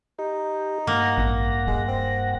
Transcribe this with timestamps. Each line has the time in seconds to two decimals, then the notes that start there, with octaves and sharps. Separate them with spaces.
0.19 D#4 G4
0.87 G2 A#3 F#5 A#6
1.18 A1
1.67 D#1 G#3
1.88 C4